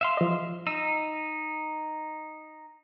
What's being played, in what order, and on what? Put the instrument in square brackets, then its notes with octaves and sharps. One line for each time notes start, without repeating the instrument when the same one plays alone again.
[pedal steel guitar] E5 F5 C6
[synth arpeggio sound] F3 D#5
[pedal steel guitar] D#4 [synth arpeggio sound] E6